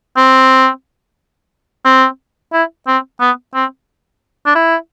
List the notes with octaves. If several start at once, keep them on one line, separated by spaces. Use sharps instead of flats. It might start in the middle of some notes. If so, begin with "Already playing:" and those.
C4
C4
E4
C4
B3
C4
D4
E4